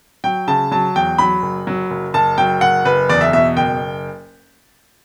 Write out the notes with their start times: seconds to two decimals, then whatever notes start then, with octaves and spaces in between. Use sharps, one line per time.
0.24 F#3 G5
0.48 C#3 A5
0.71 F#3 A5
0.96 E2 G5
1.18 F#3 B5
1.42 F#1
1.67 F#3
1.90 F#1
2.14 F#1 A5
2.38 F#3 G5
2.61 F#1 F#5
2.85 F#1 B4
3.09 E2 D5
3.21 E5
3.33 B2 E5
3.56 F#1 G5